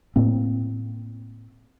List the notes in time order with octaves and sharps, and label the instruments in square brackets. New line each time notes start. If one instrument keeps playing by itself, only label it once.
[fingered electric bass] A2 A#3 C4